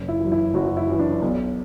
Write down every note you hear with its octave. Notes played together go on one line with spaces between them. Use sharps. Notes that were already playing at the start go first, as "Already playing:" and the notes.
Already playing: F#1
E4
F#2 E3
E4
F#1 F#4
E4
F#2 E3
D4
B1